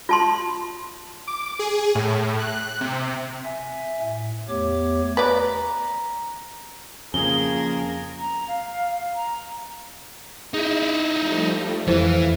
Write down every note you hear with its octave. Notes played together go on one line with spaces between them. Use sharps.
F4 A5 C6
D6
G#4
A2
F#6
C3
E5 G#5
A2
E2 A3 B3 G4 C#5 D6
B4 D5 A#5
F2 C#3 F3 A#3 G#4 A#4 G7
A#5
F5
A#5
D#4 E4 G#4
F3 G3 A3
F2 E3 E4 A4 C5 F5